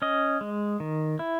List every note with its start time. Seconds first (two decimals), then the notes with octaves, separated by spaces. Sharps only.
0.02 C#4 D#5
0.41 G#3
0.80 D#3
1.19 E4